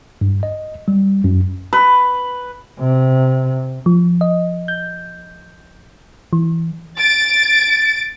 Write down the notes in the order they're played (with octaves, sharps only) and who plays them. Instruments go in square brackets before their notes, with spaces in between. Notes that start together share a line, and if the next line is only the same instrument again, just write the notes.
[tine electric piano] G2
D#5
G3
F#2
[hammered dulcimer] B4
[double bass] C3
[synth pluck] F3
D#5
G6
E3
[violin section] A6 D7